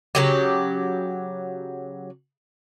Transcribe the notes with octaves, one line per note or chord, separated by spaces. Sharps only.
C#3 F#3 G4